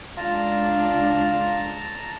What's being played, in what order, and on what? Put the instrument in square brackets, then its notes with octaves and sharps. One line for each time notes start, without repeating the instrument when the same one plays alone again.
[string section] C#2 D4 [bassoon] F4 [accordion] A5 A#5